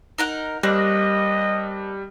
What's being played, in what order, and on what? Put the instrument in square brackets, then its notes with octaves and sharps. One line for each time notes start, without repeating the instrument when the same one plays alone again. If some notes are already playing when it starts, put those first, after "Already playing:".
[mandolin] D#4 A#4 F#5
[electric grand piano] G3 F#6 A#6 [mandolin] A#3 C4 D4 [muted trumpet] D#5